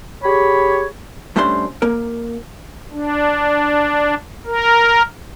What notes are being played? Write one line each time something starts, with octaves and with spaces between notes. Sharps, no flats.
G4 G#4 C#5 B5
G2 A3 C#4 D4 C5 C6
A#3 A#4
D4
A#4